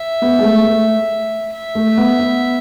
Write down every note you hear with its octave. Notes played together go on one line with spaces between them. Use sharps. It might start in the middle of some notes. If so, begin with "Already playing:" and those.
Already playing: E5
B3
G#3
A3
A3
E5
A3
B3
B3